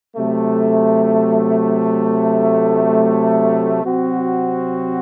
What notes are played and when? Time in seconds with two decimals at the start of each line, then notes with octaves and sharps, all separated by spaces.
0.16 C3 F#3 A3
3.83 C3 F#3 C4 F#4